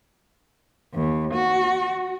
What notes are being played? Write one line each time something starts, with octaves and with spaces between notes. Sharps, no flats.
D#2
F#4